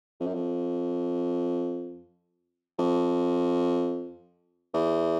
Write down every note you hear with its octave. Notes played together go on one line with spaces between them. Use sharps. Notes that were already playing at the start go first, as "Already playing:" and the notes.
F2
F#2
F2
F2
E2